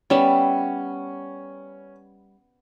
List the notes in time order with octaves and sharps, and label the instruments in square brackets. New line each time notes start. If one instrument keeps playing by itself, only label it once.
[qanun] G3 B3 E5 [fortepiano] C#4